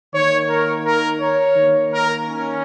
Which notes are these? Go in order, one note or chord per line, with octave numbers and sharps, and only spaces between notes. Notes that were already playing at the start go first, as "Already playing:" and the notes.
D#3 A#3 C#5
A#4
A#4
C#5
D#3 A#3
A#4
C#4